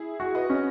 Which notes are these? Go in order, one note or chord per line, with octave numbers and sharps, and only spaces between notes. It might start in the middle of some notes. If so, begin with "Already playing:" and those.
Already playing: E4 G#4
F#4
B4 D#5
C#4